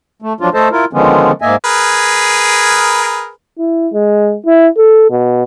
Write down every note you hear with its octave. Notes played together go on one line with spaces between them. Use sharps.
A3
F3 F#3 D4 F4
A3 A4 C5 D#5 A5
E4 F4 A#4
D3 D#3 F3 G#3 B3 C#4
G#2 A#3 D#5 E5 G#5
G#4 A#4 B4
E4
G#3
E4
A4
B2